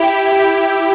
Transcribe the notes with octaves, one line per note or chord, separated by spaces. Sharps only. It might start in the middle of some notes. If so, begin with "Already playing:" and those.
Already playing: E4 G4
E4 G4